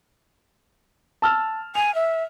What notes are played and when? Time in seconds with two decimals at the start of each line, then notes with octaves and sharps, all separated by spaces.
1.22 A5 E6 F6
1.75 G#5 F7
1.95 E5